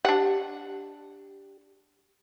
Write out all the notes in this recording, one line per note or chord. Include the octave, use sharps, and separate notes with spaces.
D4 G4 F#5